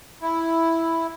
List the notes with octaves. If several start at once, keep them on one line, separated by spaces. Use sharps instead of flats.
E4